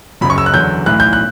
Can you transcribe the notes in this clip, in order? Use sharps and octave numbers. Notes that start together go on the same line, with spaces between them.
F#1 F#2 C#3 F#3 B5
C#6
E6
F#6
E2 D3 F#3 G6
B1 A2 E3 F#6
G6
F#6